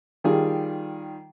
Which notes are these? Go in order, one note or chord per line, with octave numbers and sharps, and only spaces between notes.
D#3 G3 F4 G#4